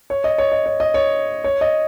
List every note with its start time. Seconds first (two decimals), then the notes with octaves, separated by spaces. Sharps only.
0.10 C#5
0.24 D#5
0.38 C#5
0.52 D#5
0.66 C#5
0.80 D#5
0.94 C#5
1.44 C#5
1.61 D#5